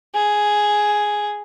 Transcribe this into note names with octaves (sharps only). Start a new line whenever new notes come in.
G#4